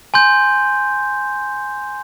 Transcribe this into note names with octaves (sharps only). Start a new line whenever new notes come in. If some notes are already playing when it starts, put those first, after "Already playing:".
G#5 C6 G6